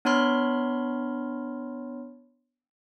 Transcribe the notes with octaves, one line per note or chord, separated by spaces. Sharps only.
B3 D4 C#5 B5 C6 F6